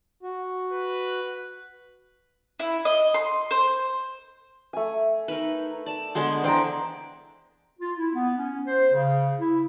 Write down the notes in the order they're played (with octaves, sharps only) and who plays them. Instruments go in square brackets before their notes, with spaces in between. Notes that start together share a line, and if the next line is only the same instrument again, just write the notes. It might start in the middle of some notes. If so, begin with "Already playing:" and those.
[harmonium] F#4
[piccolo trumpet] B4
[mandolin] E4
D#5
C6
C5
[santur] A3 G#5
[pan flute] D#4 [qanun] A#4 B4
[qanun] D5 [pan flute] A5
[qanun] D3 G#3 B3 [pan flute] C6
[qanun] D3 E3 D4 [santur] C5 A#5 [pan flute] G5
[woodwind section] F4
E4
B3
C#4
C5
C#3
E4